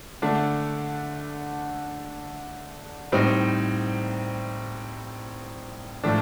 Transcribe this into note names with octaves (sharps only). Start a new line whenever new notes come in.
D3 A3 D4
A2 G3 C4 D#4
A2 F3 A3 D4